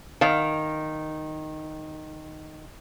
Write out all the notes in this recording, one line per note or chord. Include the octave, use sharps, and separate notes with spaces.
D#3 F5